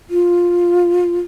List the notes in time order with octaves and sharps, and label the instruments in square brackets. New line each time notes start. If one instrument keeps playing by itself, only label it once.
[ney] F4